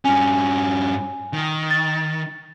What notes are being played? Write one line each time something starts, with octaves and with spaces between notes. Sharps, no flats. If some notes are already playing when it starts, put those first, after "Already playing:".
G2 C#4 G#5
D#3
A6